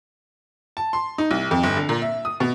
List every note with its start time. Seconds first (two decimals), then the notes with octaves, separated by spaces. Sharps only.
0.77 A5
0.93 C6
1.18 D#4
1.31 C2
1.51 F2
1.63 G1
1.77 D3
1.89 A#2
2.02 E5
2.25 D#6
2.40 B2